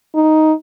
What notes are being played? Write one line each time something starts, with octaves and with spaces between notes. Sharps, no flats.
D#4